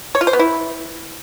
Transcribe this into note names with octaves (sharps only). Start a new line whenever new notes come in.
C#5
F4
C5
B3
E4